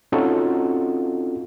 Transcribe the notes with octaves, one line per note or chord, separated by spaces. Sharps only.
C4 C#4 D#4 F4 F#4 A4